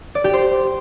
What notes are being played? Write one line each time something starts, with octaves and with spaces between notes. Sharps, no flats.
D5
G4
C5